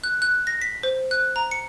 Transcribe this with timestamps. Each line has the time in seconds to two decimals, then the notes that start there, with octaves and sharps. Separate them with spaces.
0.04 F#6
0.22 F#6
0.47 A#6
0.62 B6
0.83 C5
1.11 F#6
1.36 A#5
1.51 C#7